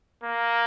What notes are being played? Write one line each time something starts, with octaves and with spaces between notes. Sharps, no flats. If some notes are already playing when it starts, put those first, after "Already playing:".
A#3